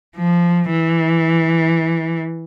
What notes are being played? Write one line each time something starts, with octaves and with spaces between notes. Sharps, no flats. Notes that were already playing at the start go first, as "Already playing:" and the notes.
F3
E3